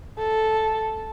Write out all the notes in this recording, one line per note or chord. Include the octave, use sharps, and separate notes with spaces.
A4